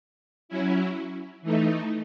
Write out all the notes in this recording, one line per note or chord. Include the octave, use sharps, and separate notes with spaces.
F#3 C#4 E4
E3 A3 D#4